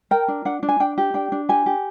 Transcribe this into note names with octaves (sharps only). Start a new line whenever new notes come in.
A#4 G5
D4
D4 F#5
D4
G#5
D4 G5
G4
D4 G5
D4
G4 G#5
G4